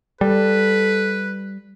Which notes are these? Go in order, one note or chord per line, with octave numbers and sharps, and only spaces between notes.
G3 A4 B4